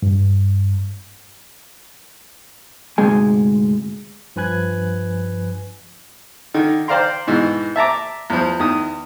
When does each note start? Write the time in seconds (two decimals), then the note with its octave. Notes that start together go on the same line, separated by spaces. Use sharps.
0.02 G2
2.98 D2 G#2 C3 G#3 G#5
4.36 G2 F3 B4 G#5 F#6 G#6
6.54 D3 D#3
6.88 C5 D5 F5 G5 A#5 C6
7.27 G#2 B2 E3
7.76 E5 A5 A#5 D6
8.30 E2 F3
8.60 E2 D#3 D#6